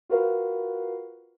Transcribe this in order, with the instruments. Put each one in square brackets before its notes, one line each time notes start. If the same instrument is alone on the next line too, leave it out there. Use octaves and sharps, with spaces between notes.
[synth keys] F4 F#4 A#4 B4 F5